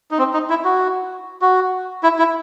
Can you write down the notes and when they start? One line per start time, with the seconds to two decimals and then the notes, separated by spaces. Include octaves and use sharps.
0.11 D#4
0.19 C4
0.34 D#4
0.50 E4
0.65 F#4
1.42 F#4
2.03 E4
2.18 E4